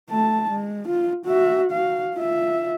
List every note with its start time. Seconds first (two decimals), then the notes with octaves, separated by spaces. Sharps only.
0.10 A3 A5
0.50 G#3
0.88 F4
1.26 F#4 E5
1.71 F#4 F5
2.16 F4 E5